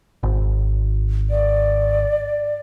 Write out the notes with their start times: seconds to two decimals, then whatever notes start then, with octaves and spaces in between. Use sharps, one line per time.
0.23 G#1
1.31 D5